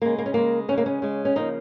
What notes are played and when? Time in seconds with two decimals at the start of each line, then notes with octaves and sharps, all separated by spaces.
0.02 C#3 G#3 A#3
0.18 A#3
0.26 C#4
0.34 C#3 G#3 A#3
0.68 C#3 G#3 C#4
0.78 A#3
0.86 C#4
1.02 C#3 G#3
1.25 C#4
1.35 C#3 F3 A#3 D#4